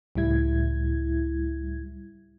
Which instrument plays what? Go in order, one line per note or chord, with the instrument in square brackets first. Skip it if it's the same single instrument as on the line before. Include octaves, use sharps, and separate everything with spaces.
[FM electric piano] C#2 A2 G3 E4 G#6